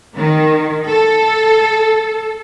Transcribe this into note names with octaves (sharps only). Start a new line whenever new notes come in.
D#3
A4